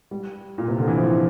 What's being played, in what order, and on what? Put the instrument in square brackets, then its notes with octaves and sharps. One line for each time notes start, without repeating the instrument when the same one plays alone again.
[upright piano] G3
A#2
C3
D3
E3
F3